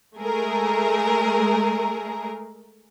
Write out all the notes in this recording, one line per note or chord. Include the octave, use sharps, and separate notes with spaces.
G#3 A3 G#4 A#4